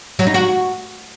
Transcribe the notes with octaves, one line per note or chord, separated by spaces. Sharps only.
F#3
D#4
F#4